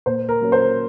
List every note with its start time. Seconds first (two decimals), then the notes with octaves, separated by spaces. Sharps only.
0.06 A#2 C5
0.29 A#4
0.41 F#3 A#3 C#4
0.52 C5